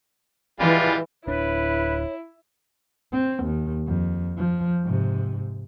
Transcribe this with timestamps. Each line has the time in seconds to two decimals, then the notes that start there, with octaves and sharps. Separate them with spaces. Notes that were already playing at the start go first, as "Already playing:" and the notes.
0.60 E3 G3 G#3 F4
1.27 D1 D4 E4 B4 C#5
3.12 C4
3.44 D#2
3.87 F2
4.37 F3
4.84 G#2 C3